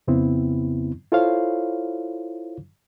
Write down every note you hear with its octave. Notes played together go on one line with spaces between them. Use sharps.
F2 C#3 B3 C4 E4
E4 F4 A4 C5 C#5 F5